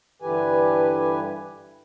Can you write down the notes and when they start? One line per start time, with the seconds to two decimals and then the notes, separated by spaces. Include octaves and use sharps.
0.22 G2 D3 E3 G4 B4 G#5